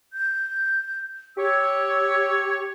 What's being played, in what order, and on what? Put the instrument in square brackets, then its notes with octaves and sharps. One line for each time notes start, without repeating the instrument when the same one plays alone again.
[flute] G6
[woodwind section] G4 C#5 [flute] E6